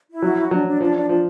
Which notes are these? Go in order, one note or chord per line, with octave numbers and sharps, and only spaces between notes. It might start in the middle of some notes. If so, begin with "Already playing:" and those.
E4
F#3 F#4
F#4
F#3 D4
D4
F3 D4
D4
F3 D4